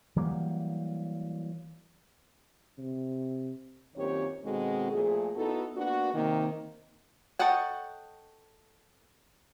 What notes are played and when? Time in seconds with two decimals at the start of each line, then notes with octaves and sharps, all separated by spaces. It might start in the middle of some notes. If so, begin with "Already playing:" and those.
0.16 E3 F#3 G3 A#3
2.78 C3
3.96 F#2 A#2 D#3 C4 G4 C#5
4.45 B2 D#3 G#3 C4 F#4 A4
4.91 A#2 F3 A3 G#4
5.35 B3 D#4 E4 F#4 A4
5.76 A#3 B3 D4 F#4
6.14 C3 D#3 A#3
7.39 A4 C#5 D#5 F#5 G5